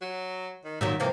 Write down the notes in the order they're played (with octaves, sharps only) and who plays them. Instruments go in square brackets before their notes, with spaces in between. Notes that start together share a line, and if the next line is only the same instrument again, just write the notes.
[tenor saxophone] F#3
D#3
[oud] A#2 D#3 F#3 [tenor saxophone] E5
[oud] C3 E3 F3 [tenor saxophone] A#3